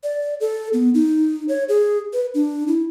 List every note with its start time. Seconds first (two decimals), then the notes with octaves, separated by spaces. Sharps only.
0.03 D5
0.40 A4
0.73 B3
0.94 D#4
1.48 C#5
1.69 G#4
2.13 B4
2.34 D4
2.68 E4